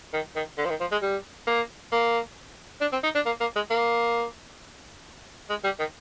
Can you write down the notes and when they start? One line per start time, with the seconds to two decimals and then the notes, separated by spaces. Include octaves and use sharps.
0.13 D#3
0.36 D#3
0.58 D3
0.65 F3
0.69 D#3
0.80 F3
0.92 G#3
1.02 G3
1.47 A#3
1.92 A#3
2.81 D4
2.92 C4
3.03 D#4
3.15 D4
3.26 A#3
3.41 A#3
3.56 G#3
3.71 A#3
5.49 G#3
5.64 G3
5.79 D#3